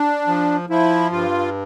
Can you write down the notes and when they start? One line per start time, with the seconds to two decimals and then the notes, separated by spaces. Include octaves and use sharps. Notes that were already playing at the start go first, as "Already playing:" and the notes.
Already playing: D4
0.27 F3
0.69 F3 E4
1.11 G2 F4